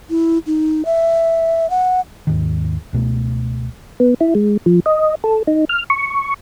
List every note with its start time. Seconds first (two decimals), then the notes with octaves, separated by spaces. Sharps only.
0.10 E4
0.46 D#4
0.85 E5
1.70 F#5
2.27 D#2 G#2 D#3
2.93 C#2 B2 A3
4.00 B3
4.21 E4
4.35 G#3
4.66 F3
4.86 D#5
5.24 A4
5.47 D#4
5.69 F6
5.90 C#6